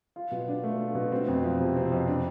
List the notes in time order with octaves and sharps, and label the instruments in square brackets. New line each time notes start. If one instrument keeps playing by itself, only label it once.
[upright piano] F4
B2
D4
A3
F4
B2
C4
F2
F3
C3
C4
F2
D4